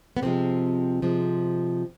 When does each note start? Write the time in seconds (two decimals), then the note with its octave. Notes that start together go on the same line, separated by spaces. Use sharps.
0.17 B3
0.22 C3 F3 G#3 A#3 C4
1.02 C3 F3 G#3